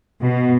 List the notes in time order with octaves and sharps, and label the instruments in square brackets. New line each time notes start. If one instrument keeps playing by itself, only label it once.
[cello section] B2